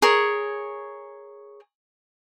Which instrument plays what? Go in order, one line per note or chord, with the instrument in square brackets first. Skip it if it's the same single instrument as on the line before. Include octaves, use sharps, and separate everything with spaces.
[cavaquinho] G#4 A#4 C#5